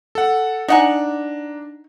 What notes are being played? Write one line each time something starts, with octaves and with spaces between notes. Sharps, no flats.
A4 F#5
D4 D#4 F#5 G#5 A#5